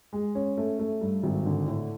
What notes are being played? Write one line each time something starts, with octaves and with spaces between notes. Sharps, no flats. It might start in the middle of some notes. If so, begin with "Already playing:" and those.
G#3
C#4
A3
A3
G2
G#1
D3
A2